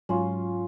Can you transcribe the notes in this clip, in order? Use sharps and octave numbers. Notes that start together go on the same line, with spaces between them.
G#2 F#3 C#4 F4